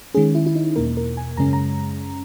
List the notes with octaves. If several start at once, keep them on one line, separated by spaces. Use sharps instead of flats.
D#3 G#3 C#4 G#4
E4
E4
D#4
E2 B2 A#3 A#4
A#4
G#5
F#2 C#3 G#3 C#4 A#5
A#5